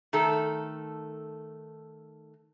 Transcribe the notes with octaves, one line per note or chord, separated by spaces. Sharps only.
D#3 A3 A4